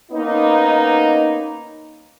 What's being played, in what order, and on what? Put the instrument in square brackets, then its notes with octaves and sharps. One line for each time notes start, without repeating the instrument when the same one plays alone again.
[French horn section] A#3 B3 C#4 D#4